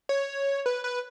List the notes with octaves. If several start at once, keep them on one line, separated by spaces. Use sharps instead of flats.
C#5
B4
B4